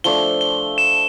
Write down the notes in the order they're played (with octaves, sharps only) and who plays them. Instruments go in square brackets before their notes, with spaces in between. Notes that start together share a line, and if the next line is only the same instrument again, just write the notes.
[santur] F3 A3 D4 [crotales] G7
[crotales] G7
E7